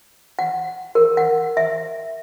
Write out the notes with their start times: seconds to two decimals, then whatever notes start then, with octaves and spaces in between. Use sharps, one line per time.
0.39 F#5
0.95 A#4
1.17 F#5
1.57 E5